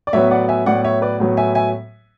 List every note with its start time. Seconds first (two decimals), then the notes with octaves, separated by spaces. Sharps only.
0.07 D5
0.13 A2 F#3 B3 C#5 E5
0.31 D5 F#5
0.49 E5 G#5
0.66 A2 F#3 B3 D5 F#5
0.84 C#5 E5
1.02 B4 D5
1.20 A2 F#3 B3
1.37 E5 G#5
1.55 E5 G#5